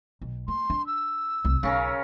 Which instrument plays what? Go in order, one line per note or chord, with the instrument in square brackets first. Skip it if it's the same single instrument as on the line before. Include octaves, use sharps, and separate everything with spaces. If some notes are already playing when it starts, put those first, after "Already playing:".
[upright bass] B1
[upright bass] A#3 [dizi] C6
[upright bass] D4
[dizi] E6
[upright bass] C2
[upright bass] B1 [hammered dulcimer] C#3 C#4 A#4